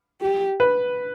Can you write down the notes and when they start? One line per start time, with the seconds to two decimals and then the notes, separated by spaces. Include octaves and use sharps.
0.21 G4
0.60 B4